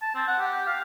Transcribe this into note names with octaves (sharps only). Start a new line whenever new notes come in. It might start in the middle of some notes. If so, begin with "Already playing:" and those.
A5
C4
F#5
G4
F5